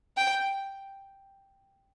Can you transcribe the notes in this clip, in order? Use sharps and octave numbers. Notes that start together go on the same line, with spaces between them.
G5